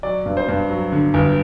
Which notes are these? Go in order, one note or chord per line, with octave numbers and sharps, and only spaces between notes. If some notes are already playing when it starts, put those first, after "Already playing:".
F#3 D5
G2
C5
G2
F#3
D3
G1